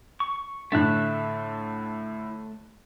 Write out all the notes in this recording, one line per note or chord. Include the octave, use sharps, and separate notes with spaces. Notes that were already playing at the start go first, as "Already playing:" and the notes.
C#6
A2 D3 A3 E5 F#6